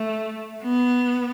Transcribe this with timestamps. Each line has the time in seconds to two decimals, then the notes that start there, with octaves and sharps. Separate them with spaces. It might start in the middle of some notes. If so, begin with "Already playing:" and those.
Already playing: A3
0.62 B3